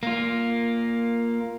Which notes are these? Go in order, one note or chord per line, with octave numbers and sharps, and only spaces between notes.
A#3 F4